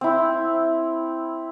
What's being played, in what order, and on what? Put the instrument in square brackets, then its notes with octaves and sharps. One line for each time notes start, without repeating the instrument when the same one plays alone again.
[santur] C4 E4